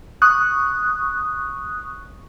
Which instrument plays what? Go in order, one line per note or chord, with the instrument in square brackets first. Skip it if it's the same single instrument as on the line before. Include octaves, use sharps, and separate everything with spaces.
[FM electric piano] C#6 D#6 F#6